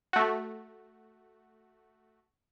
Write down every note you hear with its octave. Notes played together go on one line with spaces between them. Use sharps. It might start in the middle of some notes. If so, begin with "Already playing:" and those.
A3 F#4